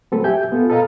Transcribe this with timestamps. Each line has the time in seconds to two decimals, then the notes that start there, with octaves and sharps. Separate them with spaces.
0.12 F#3 A3 C4 A4 B4
0.24 G4 E5 G#5 G6
0.52 B3 F4 A4
0.70 A4 B4 D#5 F5 A5 A#5